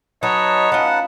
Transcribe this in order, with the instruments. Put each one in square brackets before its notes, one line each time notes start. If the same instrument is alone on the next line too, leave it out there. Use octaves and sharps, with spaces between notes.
[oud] F#3 [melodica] D#4 B4 A5 [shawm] C#5 [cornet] D#5
[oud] C#4 F4 [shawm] F#5